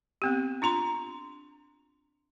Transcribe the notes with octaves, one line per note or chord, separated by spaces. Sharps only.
B3 C4 G4
D4 F4 A#5 C6